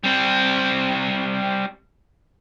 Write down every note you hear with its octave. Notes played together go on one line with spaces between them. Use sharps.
G3 C4